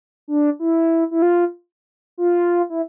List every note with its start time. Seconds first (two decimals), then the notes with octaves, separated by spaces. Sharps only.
0.28 D4
0.59 E4
1.11 E4
1.22 F4
2.18 F4
2.70 E4